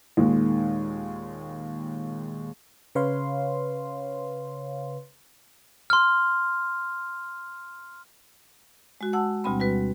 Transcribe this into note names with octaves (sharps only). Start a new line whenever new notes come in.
D#2 A#2 D#3 G#3
C#3 B4 C#5 F5 C6
C6 F6
G#3 F#4
F#5 A5 E6
D2 B2 G3 C4 B5
G3 F#4 B4